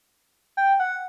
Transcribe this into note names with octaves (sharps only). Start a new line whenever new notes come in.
G5
F#5